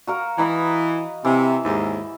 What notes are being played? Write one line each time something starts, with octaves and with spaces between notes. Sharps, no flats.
F#4 A#4 F5
E3 D#5 A#5 B5
C3 E3
D#2 G#2